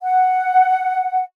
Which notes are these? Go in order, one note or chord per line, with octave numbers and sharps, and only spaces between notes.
F#5